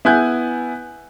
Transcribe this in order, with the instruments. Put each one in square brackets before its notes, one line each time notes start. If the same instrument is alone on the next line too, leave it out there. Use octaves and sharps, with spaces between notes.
[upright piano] B3 E4 G#5 F#6 G6